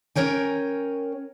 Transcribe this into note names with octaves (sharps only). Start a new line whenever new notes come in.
C#4 A#4 C#5 G5 G#5